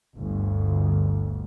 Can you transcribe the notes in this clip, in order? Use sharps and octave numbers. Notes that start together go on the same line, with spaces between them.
G1 D2